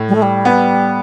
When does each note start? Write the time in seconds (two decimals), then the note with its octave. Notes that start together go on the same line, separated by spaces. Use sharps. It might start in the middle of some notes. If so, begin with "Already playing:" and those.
Already playing: A2
0.08 G3
0.15 A3
0.22 G3
0.45 B3